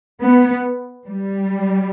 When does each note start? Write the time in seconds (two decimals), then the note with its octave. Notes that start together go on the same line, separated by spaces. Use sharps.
0.21 B3
1.07 G3